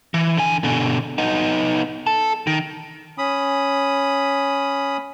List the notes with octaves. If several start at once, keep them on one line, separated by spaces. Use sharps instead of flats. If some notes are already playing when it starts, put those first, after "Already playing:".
E3
D3 G#5
B2 D3
B3 D#4
A4
D#3
C#4 B5 D#6